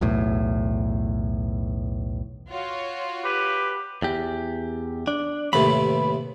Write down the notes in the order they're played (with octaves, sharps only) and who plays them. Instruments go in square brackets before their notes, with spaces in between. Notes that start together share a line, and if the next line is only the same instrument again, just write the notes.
[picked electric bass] B1 E2 A2
[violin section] F4 F#4 C#5
[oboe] G4 [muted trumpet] B4
[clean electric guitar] E2 G4
D4
[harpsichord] D#2 A2 C3 [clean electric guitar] B4 B5